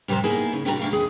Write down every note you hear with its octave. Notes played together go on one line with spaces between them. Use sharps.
F2 C3 G3 C5 A#5
A#3 B3 D#4 E4 G#4
C#3
C3 G3 D4 F#4 F5 A#5
D3 A3 F5
D#2 G#4